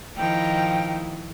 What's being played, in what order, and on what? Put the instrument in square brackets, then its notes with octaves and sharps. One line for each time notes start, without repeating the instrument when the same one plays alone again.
[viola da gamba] D#3 F3 E4 [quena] G5